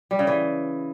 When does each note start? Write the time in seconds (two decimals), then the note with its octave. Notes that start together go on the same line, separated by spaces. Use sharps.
0.11 G3
0.19 C#3
0.27 E3